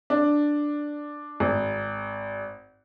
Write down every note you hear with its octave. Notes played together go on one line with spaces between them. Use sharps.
D4
G#1